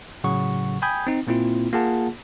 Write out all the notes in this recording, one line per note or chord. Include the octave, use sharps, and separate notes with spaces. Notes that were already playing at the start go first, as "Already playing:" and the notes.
A2 C#3 F#3 F#5 C#6
G5 G#5 B5 D#6 G6 G#6
C4 D#4
A#2 A#3 C4 E4 F4
A#3 F4 G#4 F#5 A5